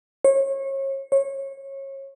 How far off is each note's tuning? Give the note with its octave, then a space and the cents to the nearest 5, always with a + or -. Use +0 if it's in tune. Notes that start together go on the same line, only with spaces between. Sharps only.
C#5 -30
C#5 -25